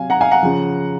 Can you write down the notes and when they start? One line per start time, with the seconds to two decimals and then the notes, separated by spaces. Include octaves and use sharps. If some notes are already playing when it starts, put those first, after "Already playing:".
Already playing: C3 F#3 F5 G#5
0.10 F#5 A#5
0.21 F5 G#5
0.31 F#5 A#5
0.43 C#3 F3